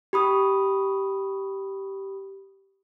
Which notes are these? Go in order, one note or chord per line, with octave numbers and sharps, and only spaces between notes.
G4 B5 D#6